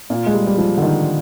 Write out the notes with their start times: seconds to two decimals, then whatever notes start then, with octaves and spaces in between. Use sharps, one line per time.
0.10 A#2
0.26 G#3
0.34 G3
0.47 G3
0.58 F3
0.78 D3
0.82 D#3